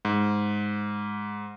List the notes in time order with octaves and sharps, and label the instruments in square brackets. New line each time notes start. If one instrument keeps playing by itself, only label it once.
[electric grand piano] G#2